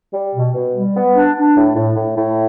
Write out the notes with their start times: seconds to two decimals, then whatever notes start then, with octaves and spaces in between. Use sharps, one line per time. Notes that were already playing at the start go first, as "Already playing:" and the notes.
0.14 G3
0.34 B2
0.55 B2
0.75 G3
0.95 B3
1.15 D4
1.36 D4
1.56 A2
1.76 A2
1.96 A2
2.17 A2